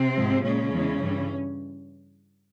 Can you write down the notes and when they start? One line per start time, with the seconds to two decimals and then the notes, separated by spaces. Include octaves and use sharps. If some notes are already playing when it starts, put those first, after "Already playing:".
Already playing: C3 C4
0.16 G#2 F3 G#3
0.43 A#2 C#3 G#3 C#4
0.72 E2 E3 G#3
1.00 G2 E3 G3